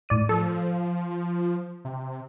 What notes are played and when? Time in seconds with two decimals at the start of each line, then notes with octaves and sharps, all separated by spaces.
0.09 A2 D5 D#7
0.29 F3 A4
1.85 C3